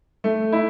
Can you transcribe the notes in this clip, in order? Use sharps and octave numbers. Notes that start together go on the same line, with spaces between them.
A3
E4